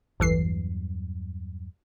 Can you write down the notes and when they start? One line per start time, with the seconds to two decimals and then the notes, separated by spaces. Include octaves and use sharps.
0.20 A1 E2 G2 E3 F#3 C7